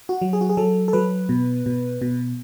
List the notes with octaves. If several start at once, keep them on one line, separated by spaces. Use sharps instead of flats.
F#4
F#3
G#4
F#4
G#4
F#3 A4
A4
F#3 B4
B2
B2
B2